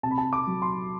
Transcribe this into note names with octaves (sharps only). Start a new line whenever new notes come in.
C3 A5
B5
A5
D6
F#3
C6